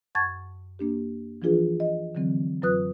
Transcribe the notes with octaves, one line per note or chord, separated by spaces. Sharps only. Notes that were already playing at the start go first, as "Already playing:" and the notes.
F#2 F#5 A5 C#6 G#6 A6
A#3 D4 G4
E3 F3 D4 F4 G#4 B4
D#5
D3 E3 F#3 C4
F#2 F#3 F4 B4 D#6 F#6